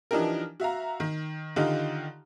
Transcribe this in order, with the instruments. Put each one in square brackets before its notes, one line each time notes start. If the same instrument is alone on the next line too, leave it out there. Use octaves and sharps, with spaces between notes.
[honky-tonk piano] E3 F3 D4 D#4 G4 A#4
F#4 E5 F5 A#5
D#3
D3 D#3 D#4 F4 G4